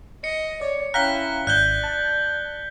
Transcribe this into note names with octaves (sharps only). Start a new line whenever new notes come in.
D#5 C#7
C#5 D5
C#4 E4 F5 G5 A#5 F#6 B6 G7
G#1 D5 F#6 G6 G7
A5